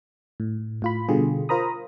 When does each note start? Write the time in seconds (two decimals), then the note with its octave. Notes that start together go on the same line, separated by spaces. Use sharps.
0.40 A2
0.82 A2 F4 B5
1.08 B2 D3 G3 F4 G4 G#4
1.49 F4 A#4 C5 A#5 B5 D#6